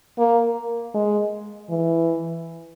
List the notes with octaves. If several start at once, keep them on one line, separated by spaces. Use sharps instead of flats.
A#3
G#3
E3